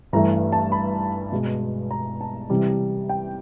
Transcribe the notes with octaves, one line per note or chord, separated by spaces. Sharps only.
G2 E3 A3 A#5
A5
B5
B2 G#3
A#5
A5
C3 E3 G3
G5